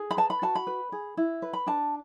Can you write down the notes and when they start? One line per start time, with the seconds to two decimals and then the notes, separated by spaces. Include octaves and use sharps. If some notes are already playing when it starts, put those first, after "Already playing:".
Already playing: G#4
0.11 B5
0.17 B4 A5
0.30 B5
0.42 F#4 A5
0.55 B5
0.67 B4
0.92 G#4
1.17 E4
1.42 B4
1.53 B5
1.66 D4 A5